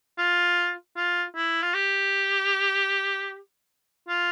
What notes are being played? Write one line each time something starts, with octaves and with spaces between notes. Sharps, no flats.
F4
F4
E4
F4
G4
F4